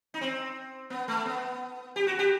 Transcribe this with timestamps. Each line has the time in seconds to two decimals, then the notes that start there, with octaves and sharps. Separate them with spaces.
0.14 D#4
0.21 C4
0.90 B3
1.08 A3
1.26 B3
1.96 G4
2.07 F#4
2.19 G4